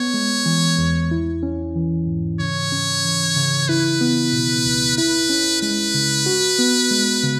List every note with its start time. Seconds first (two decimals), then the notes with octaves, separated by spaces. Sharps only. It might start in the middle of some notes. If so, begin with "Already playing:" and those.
Already playing: B3 C#5
0.14 G#3
0.46 E3
0.78 E2
1.11 E4
1.43 C#4
1.76 E3
2.07 G#2
2.40 C#3 C#5
2.72 C#4
3.05 E3
3.36 C#3
3.69 E4 B4
4.01 B3
4.33 B2
4.65 C#2
4.97 E4 B4
5.29 C#4
5.62 G#3 B4
5.94 C#3
6.26 F#4
6.59 B3
6.91 G#3
7.23 C#3